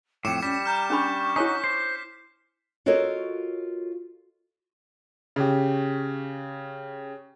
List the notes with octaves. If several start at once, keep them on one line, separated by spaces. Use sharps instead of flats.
F2 A2 G5 D6 C#7 E7
G3 C#4 B6
A#5 F6 G6
C#4 D4 B5 C#6
D#4 E4 F#4 C#5 G#5 B6
C5
F4 F#4 A4 A#4 C#5 D#5
C#3 G4